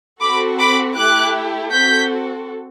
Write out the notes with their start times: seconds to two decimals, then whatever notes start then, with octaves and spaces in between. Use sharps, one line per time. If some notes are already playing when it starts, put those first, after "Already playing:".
0.21 C4 F#4 A4 B5 D6
0.59 B5 D6
0.97 A3 E4 G4 D6 F#6
1.72 C4 F#4 A4 G6 B6